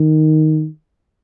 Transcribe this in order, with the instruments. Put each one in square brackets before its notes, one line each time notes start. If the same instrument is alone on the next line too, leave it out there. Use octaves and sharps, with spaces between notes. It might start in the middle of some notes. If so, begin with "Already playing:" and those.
Already playing: [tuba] D#3